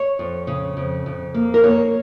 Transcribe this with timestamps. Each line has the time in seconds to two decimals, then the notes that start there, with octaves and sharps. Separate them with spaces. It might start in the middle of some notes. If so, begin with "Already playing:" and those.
Already playing: C#5
0.19 F2
0.47 C#3
0.77 F2
1.06 F2
1.34 A#3
1.54 A#4
1.63 A#3 C#5